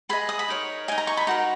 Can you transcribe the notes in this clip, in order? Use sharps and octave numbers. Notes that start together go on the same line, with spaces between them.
G#4 B4 D#5 B5
D#6
B5
D#4 A#4 C#5
D#4 A#4 D#5 G#5
A#5
C#6
B5
D#4 F#4 A#4 A#5